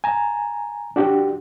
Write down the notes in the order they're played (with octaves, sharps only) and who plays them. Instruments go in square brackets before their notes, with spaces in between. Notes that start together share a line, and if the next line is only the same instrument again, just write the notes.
[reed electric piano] G#5 A#5
D4 F#4 G4